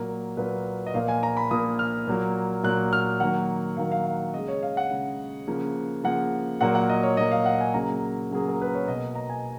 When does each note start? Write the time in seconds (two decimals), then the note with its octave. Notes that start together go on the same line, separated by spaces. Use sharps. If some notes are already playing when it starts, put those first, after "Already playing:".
Already playing: A#2 F#3 A#3 A#4
0.37 A#2 F#3 A#3 B4
0.87 D#5
0.94 A#2 F3 A#3 F5
1.08 G#5
1.23 A#5
1.37 B5
1.51 A#2 F3 A#3 D#6
1.79 F6
2.07 A#2 F#3 A#3
2.63 A#2 F#3 A#3 F#6
2.93 F6
3.20 D#3 F#3 A#3 F#5
3.77 D#3 F#3 A#3 F5
3.92 F5
4.06 F5
4.34 C#3 G#3 D#5
4.48 C#5
4.63 F5
4.77 F#5
4.91 C#3 G#3
5.48 C#3 F3 A#3
6.04 C#3 F3 A#3 F#5
6.61 A#2 F#3 A#3 F#5
6.75 F#5
6.89 D#5
7.03 C#5
7.17 A#2 F#3 A#3 D#5
7.31 F5
7.46 F#5
7.61 G#5
7.74 C#3 F#3 A#3 A#5
8.31 C#3 F#3 A#3 G#4
8.48 A#4
8.61 B4
8.75 C#5
8.87 B2 A#3 D#5
9.15 A#5
9.29 G#5